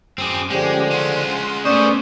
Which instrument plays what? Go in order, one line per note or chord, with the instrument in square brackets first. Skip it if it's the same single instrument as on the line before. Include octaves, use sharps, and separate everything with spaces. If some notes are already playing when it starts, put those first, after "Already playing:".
[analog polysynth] F#2 D6 [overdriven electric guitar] C4 G#4
[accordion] D3 F3 [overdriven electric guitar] G#3 [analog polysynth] C#4 G4
[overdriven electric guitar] G#3 C#4 [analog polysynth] F#5 C6
[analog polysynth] A3 B3 C#4 [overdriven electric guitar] G#4 C5 [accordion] D5 C#6 D#6